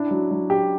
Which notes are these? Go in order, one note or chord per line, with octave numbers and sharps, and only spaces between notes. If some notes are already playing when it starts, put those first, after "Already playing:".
Already playing: D4 E4
F#3
F#3
G4